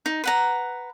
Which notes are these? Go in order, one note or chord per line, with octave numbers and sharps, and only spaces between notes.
D#4
B4 F#5 A#5